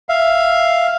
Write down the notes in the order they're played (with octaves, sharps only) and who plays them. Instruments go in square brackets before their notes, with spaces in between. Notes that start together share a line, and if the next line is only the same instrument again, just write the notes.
[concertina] E5 F5